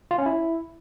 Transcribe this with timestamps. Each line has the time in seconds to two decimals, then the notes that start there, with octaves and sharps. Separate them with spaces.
0.11 F4
0.18 C#4
0.26 E4